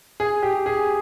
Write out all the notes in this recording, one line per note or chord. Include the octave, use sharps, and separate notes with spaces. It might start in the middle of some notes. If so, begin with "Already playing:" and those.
G#4
G4
G#4